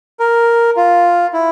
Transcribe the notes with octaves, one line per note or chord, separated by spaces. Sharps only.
A#4
F4
E4